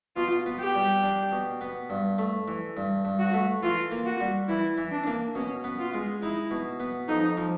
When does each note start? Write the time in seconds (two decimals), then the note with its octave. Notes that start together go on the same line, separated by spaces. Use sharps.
0.16 B2 F4
0.46 B3
0.60 G4
0.75 G3
1.03 D4
1.32 B2
1.61 B3
1.90 G2
2.18 A3
2.48 E3
2.77 G2
3.05 G2
3.20 F#4
3.34 A3
3.63 E3 F4
3.91 A#3
4.06 F#4
4.21 G3
4.48 E3 E4
4.78 E3
4.92 D4
5.07 A#3
5.35 B2 C#4
5.64 B3
5.79 F4
5.94 G#3
6.22 D#4 E4
6.51 B2
6.80 B3
7.08 F2 D#4
7.37 F3